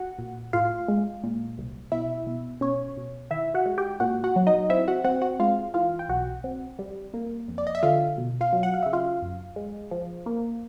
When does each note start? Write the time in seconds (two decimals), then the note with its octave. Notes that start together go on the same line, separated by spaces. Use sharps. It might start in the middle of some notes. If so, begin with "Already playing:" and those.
Already playing: F#4 F#5
0.18 A#2
0.53 A2 F4 F5
0.88 G#3
1.23 A#2
1.58 C2
1.92 B2 E4 E5
2.27 B2
2.61 B2 C#4 C#5
2.97 B2
3.31 D#3 E4 E5
3.54 F#4 F#5
3.66 G#3
3.78 G4 G5
4.00 A#2 F#4 F#5
4.24 F#4 F#5
4.36 F#3
4.47 D#4 D#5
4.70 C4 E4 E5
4.88 F#4 F#5
5.04 C4 F#4 F#5
5.22 F#4 F#5
5.40 G#3 F4 F5
5.74 E3 F4 F5
5.99 G5
6.09 B1 F#4 F#5
6.44 C4
6.79 G3
7.14 A#3
7.48 F2
7.58 D5
7.67 D#5
7.75 E5
7.83 D3 F4 F5
8.18 B2
8.41 F4 F5
8.53 F#3
8.63 F#5
8.74 F5
8.83 C#3 E5
8.93 F4 F5
9.22 F#2
9.56 G#3
9.91 F3
10.26 A#3